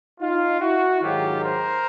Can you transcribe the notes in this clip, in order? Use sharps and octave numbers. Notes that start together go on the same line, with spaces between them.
D#4 F4
E4 F#4
G#2 D#3 F#3 F4 G4
A#4 C5